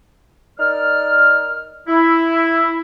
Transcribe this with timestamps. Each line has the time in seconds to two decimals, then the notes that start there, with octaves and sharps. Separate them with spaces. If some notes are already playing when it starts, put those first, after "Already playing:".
0.58 D#4 A#4 D5 F6
1.88 E4